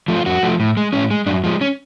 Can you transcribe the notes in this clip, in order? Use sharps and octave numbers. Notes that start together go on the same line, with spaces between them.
F3 A3
F4
F2 F#4
F3 A3
A2
G#3
A2 C#4
G#3
F#2 D4
F3 G#3
C#4